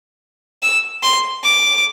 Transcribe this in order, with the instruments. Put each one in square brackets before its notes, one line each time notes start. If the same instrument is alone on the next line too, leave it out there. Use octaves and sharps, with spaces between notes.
[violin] E6
C6
D6